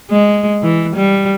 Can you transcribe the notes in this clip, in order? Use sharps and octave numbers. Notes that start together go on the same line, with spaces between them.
G#3
E3
G3